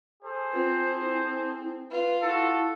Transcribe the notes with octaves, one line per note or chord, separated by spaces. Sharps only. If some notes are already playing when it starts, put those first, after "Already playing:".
G#4 A4 C5
C4 F4
E4
F4 B4
E4 F#4 A4